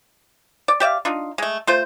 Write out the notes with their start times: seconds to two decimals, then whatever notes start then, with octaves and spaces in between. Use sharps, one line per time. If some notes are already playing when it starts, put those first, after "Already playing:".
0.68 D5
0.80 G4 D5 E5 F5
1.05 D4 D#4 F4
1.38 G#3 A3
1.67 A3 F4 C5